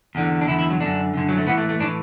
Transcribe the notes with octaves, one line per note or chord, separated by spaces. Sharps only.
E2 D3
D4
E2 D3 E4
E4
F#3
F#2 D3 D4
F#2 D3
F#3
A3
A2 E3 B3
A3
A3
A2 E3 D4